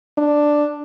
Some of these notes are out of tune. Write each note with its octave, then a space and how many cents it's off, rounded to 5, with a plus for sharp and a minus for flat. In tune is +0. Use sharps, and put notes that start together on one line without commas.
D4 +5